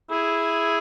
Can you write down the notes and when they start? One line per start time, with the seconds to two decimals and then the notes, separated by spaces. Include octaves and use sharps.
0.10 E4 G#4